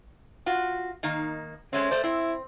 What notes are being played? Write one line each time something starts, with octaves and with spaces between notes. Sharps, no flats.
F4 F#4
D#3 A#3 D#4
G#3 A3 C4 C#4
A3 C5 D5
C4 E4